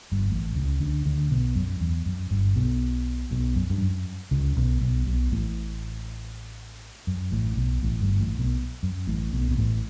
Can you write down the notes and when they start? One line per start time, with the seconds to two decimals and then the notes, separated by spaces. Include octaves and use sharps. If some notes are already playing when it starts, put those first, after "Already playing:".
0.11 G1 G2
0.30 A1 A2
0.55 C#2 C#3
0.80 D2 D3
1.05 D2 D3
1.30 B1 B2
1.55 F#2
1.80 E2
2.06 F#2
2.31 G1 G2
2.56 B1 B2
3.31 B1 B2
3.56 F#2
3.70 G2
3.81 F#2
4.31 C#2 C#3
4.56 B1 B2
4.81 B1 B2
5.07 B1 B2
5.32 A1 A2
7.07 F#2
7.32 A1 A2
7.57 B1 B2
7.83 A1 A2
8.01 G1 G2
8.20 A1 A2
8.39 B1 B2
8.83 F#2
9.07 A1 A2
9.33 B1 B2
9.51 B2
9.58 A1 A2